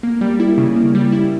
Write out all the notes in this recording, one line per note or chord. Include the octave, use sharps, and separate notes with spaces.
A#3
G3
E4
C#3
A#3
G3
E4